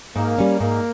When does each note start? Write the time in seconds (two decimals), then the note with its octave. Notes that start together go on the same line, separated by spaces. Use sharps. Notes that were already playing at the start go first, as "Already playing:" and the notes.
0.16 G#2 A#3
0.38 G3 C#4
0.60 G#2 A#3